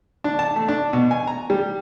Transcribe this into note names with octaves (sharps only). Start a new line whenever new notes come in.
D4
A5
A3
D4
B2
G#5
A#5
G3